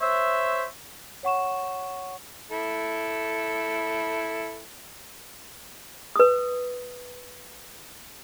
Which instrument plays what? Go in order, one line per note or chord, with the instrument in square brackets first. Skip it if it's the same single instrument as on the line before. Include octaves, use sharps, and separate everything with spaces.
[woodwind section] C5 C#5 E5
[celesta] C#5 F#5 C#6 E7
[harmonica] E4 A4
[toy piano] B4 D#6